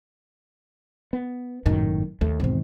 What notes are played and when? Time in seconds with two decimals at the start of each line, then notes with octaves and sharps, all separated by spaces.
1.13 B3
1.66 G#1 F#2 A2 D#3
2.21 D#2 A3
2.40 E2 G#2 B2 D#3 C4